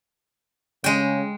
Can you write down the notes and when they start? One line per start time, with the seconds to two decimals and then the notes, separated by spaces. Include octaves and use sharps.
0.84 C#3 G#3 G5